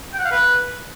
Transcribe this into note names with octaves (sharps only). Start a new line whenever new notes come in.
G5
F#5
F5
B4